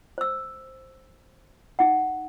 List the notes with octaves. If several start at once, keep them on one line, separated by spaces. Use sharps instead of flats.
C5 E6
D#4 F#5